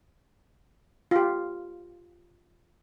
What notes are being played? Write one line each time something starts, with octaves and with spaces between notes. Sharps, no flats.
F4 G4